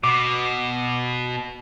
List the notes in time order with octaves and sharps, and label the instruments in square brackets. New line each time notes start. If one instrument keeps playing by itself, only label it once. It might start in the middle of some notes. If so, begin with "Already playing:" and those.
[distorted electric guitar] B2 [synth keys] D6